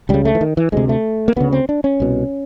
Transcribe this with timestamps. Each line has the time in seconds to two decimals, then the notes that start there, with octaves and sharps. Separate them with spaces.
0.09 C#2 C#3 G3
0.25 A3
0.35 E3
0.41 D#3
0.57 E3
0.72 D2 C3 G#3
0.89 A3
1.28 A#3
1.36 D2 C#3 B3
1.53 C4
1.69 D4
1.84 C#4
2.00 C2 B2